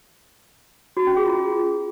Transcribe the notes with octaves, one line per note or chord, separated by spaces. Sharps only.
F#4
C#4
G#4
F4